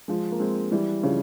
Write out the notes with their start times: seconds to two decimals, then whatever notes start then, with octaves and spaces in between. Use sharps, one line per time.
0.08 F3 G#3
0.32 A#3
0.40 G#3 C4
0.72 E3 G3
1.03 C#3 F3